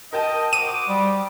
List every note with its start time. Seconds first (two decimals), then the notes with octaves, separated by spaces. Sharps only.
0.13 A#4 D#5 G5 A5
0.53 F#4 C5 D6 D#6 D#7
0.89 G3